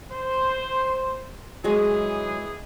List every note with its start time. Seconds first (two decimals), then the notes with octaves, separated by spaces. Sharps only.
0.10 C5
1.64 E3 F#3 G#3 D#4 F#4 G#4